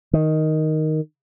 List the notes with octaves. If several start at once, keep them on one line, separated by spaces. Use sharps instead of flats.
D#3